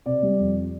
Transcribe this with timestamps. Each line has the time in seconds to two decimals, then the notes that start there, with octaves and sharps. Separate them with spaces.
0.06 C3 D5
0.23 G3
0.40 F2